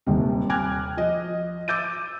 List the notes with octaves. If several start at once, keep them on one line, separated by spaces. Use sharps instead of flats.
D#1 D#2 C3
G5 G#5 D6 F6 F#6 G#6
F3 D#5
D6 E6 G6 A6 D#7